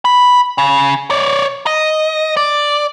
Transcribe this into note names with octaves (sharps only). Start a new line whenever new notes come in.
B5
C#3
C#5 D5
D#5
D5